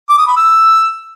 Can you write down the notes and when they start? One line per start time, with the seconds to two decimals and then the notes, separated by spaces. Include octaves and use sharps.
0.09 D6
0.18 D#6
0.27 B5
0.37 E6